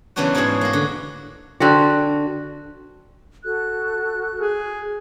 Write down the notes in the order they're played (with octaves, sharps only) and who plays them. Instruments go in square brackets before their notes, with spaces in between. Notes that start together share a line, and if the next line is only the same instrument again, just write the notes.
[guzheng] C#3 E3 F#3 B3 D4 F#4
G#2 B2 E3 E4 G#4
A#3 F#4
D3
[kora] D3 C4 F#4
[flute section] F#4 A4 F#6
[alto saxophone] G#4